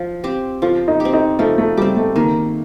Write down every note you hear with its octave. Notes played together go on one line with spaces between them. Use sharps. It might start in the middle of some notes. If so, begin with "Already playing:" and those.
Already playing: F3
C4 G4
F3 F4
D#4
G4
C4
D#4
F3 A3
A3
G3 C4 G4
A3
D#3 A#3